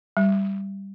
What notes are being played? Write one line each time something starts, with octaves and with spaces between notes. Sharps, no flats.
G3